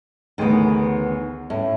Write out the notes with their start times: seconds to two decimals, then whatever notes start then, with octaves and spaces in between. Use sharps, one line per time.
0.38 A1 D2 D#3 B3 G#4
1.50 A2 C#4